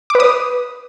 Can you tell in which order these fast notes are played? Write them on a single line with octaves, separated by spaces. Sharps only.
D6 B4 D#6